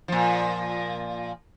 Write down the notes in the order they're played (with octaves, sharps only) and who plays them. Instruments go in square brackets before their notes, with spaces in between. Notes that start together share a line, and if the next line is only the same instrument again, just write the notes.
[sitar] A#2 F3